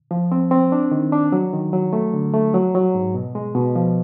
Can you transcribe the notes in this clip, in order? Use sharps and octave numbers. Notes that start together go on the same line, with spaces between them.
F3
C4
C4
D4
D#3
D4
F#3
D#3
F#3
A3
D3
A3
F#3
F#3
G#2
B2
G#3
B2
F3